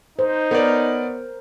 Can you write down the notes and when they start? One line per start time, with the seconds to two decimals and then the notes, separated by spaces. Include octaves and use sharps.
0.19 D#4 C5
0.51 B3 A#4 C#5 D5